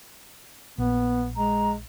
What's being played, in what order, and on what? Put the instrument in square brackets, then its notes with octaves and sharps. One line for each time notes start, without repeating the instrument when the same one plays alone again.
[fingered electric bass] A#1 [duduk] B3
[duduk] G#3 [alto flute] A#5